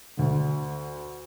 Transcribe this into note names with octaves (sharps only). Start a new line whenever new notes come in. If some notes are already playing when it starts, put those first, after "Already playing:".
D2 D3